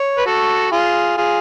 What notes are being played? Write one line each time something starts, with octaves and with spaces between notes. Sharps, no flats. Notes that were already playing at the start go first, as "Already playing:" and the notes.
Already playing: C#5
B4
F#4 A4
F4 G#4
F4 G#4